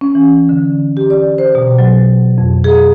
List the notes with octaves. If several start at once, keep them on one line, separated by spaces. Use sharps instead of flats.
C#4
E3
D3
G4
D5
C5
B2
F#3
F2
G#4